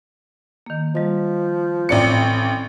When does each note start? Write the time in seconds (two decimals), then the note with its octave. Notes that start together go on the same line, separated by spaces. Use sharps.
0.66 D#3 A#3
0.95 F3 G3 D#5
1.89 A1 C4 D5 C#7